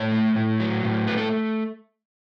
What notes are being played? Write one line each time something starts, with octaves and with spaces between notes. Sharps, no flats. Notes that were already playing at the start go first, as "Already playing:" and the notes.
Already playing: A2 C#5
A3
A2
F#3
A2
A3 B4
A4